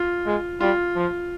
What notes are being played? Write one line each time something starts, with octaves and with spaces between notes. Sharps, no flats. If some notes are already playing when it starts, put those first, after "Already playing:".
Already playing: F4
G#3
G3 F4
F3